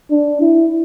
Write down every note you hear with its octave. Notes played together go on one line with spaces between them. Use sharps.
D4
E4